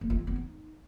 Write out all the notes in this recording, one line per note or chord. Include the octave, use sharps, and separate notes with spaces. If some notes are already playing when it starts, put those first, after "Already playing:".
A#3
F4
C4
B3
D#4